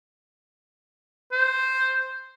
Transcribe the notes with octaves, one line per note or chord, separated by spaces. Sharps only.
C5